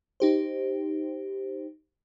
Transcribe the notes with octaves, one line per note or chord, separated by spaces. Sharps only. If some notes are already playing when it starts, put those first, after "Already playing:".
D#4 G4 C5